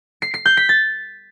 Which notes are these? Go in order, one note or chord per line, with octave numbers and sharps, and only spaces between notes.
C7
C7
G6
B6
A6